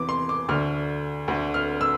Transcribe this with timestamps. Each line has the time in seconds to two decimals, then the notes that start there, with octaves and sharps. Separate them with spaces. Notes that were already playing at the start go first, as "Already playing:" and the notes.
Already playing: E2 C3 E3 D6
0.09 C6
0.29 D6
0.49 D2 D3 F6
1.28 D2 D3
1.54 F6
1.81 E6